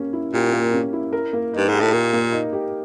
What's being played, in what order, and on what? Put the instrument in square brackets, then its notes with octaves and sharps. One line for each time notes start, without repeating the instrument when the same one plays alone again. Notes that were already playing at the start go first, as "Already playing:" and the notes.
Already playing: [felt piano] A#3 C#4 G4
E4
[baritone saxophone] A#2 [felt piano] G4
[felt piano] A#3
C#4
E4
A#4
A#3
[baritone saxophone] G2 [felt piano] D#4
[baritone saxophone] G#2 [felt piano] G4
[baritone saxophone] A2
[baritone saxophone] A#2 [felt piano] A#4
[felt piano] A#3
D#4
G4